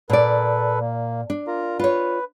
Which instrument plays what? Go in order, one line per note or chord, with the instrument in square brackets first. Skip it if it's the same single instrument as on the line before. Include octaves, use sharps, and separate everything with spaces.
[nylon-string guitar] A#2 D5 [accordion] A4 B4
[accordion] A#3
[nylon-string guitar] D4
[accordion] F4 A#4 A#5
[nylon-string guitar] F4 C#5 [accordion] B4